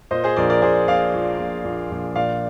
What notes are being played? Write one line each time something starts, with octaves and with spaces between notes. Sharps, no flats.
A#2 C5 D#5
G#4 C5
A#1 A#4 D5
A#4 D5
A#2 G#4 C5
A#2 D5 F5
A#2
A#1
A#1
A#1
A#2 D5 F5